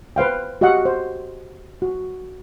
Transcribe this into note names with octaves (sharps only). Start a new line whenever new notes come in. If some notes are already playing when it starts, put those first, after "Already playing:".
B4 C5 F5 G5
F#4 G4 D#5 F5 F#5
C5
F#4